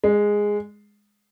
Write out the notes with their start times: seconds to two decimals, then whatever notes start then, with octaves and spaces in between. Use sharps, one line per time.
0.04 G#3